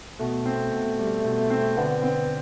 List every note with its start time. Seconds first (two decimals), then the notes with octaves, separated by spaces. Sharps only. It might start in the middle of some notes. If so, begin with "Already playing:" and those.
0.19 B2 A3
0.46 C4
0.72 B2
0.99 G3
1.25 B2
1.50 C4
1.77 D3 B3
2.03 B3 C4